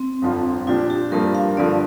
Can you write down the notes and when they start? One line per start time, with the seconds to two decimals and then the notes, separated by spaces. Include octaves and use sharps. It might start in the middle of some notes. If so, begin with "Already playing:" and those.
Already playing: C4
0.22 G1 F2 F3 D4 F4
0.67 A#2 F3 D4 F4 G4
0.90 G4
1.12 G2 F3 A#3 D4 A#4
1.35 F5
1.57 G2 D3 F3 D5